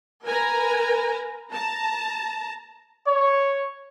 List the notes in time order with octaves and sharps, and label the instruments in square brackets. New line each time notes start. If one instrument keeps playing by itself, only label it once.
[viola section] A#4 B4 G#5 A#5
A5 A#5
[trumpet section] C#5